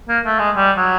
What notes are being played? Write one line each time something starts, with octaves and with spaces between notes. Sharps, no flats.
A#3
A3
G#3
G3
F#3